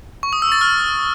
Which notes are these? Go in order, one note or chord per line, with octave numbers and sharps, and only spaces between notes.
C#6
D#6
E6
A6
F6